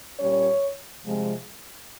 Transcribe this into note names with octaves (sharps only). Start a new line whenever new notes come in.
A#2 G3 C#4 C#5
C3 F3 G#3